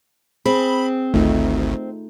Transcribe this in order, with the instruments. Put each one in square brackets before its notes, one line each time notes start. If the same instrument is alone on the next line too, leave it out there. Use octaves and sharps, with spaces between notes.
[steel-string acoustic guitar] C4 [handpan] G#4 [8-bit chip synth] B5
[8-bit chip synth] G#1 D2 [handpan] A3 D#4 F4